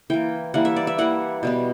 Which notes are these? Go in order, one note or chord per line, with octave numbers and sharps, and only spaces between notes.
E3 A#3 G5
E3 G3 A#3 F#5
E5
D5
E5
E3 G3 A#3 F#5
B2 G3 B3